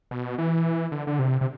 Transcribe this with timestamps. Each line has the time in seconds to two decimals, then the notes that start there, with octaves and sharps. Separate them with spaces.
0.11 B2
0.38 E3
0.92 D3
1.07 D3
1.19 C3
1.41 C3